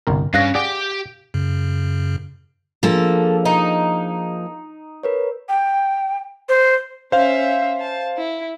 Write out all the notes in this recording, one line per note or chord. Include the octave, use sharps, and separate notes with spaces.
G1 C2 A#4
G2 C#3 F5 F#6 A#6
G4 G#4 D5 F#5 G5
F#2 C#3
F3 A#3 D4 F4 G#4 A4
D#4
A#4 B4 C#5
G5
C5
C#4 C5 E5 F5
A5
E4